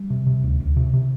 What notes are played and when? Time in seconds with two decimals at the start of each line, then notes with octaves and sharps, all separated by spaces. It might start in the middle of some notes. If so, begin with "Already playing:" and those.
Already playing: G3
0.10 C3
0.27 C3
0.43 D2
0.60 D2
0.77 C3
0.94 C3